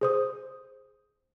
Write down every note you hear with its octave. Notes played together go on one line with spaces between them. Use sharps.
G#4 C5 D#6